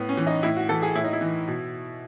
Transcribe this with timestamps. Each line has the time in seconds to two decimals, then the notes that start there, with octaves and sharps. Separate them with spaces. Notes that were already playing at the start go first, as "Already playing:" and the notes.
Already playing: A2 B3
0.09 C#4
0.17 E3
0.27 D#4
0.43 A2 E4
0.57 F#4
0.69 E3 A4
0.82 G#4
0.95 A2 E4
1.04 D#4
1.13 E4
1.21 E3
1.48 B2